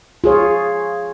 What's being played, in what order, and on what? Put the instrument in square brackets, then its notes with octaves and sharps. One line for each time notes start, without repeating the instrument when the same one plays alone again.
[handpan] F4 G#4 C#5